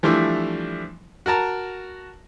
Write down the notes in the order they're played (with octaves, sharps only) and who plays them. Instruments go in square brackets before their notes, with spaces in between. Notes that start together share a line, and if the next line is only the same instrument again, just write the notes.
[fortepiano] E3 F3 G3 A3 D4 E4
F#4 A#4 A5 A#5